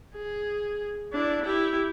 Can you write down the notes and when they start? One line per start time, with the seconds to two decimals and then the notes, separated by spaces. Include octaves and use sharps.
0.15 G#4
1.13 D4 E4
1.42 E4 G4